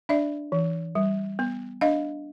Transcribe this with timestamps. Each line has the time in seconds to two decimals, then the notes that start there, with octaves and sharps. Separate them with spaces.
0.09 D4 D5 E5
0.52 E3
0.95 G3
1.39 B3
1.81 D4 D#5 F5